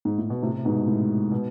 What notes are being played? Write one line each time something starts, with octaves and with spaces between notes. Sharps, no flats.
G#2
A2
B2
A2 C3
G#2 B2
A2
B2